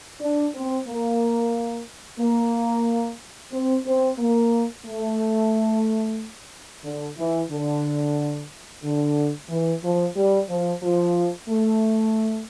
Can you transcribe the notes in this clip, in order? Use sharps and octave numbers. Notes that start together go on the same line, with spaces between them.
D4
C4
A#3
A#3
C4
C4
A#3
A3
D3
E3
D3
D3
E3
F3
G3
F3
F3
A3